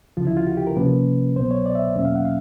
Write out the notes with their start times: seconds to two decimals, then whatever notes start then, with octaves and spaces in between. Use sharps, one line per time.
0.17 D2 C#3 F3 F4
0.27 E4
0.37 F4
0.47 F#4
0.57 G4
0.67 A#4
0.76 C3 F3 A#3 C#4 B4
1.36 C2 B2 F#3 B3 C5
1.51 C#5
1.66 D5
1.75 E5
1.95 E2 B2 F#3 A#3 C#4 E5
2.05 F5
2.16 F#5
2.25 F5